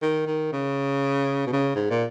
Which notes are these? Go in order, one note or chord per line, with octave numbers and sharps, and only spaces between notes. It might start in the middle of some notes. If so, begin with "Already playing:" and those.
D#3
D#3
C#3
B2
C#3
G#2
A#2